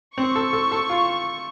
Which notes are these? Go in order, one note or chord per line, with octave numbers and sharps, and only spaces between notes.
C4 C#6
A4
A4
A4
F4